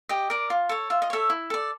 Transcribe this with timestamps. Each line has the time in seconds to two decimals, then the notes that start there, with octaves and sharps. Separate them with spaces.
0.09 G4 D#5
0.30 A#4 D5
0.50 F4
0.69 A4 C#5
0.90 F4 E5
1.02 D#5
1.10 A4 C#5 E5
1.30 E4
1.50 A4 D5